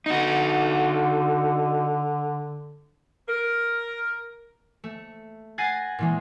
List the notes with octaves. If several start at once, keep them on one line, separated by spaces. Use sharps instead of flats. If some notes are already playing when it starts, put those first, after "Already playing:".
D3 D#4 F#4
A#4
A3
F#5 G#5 A6 A#6 C7 D#7
A#2 E3 G#3